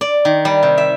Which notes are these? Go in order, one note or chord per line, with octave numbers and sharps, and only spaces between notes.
D5
D#3
G3
C3
E5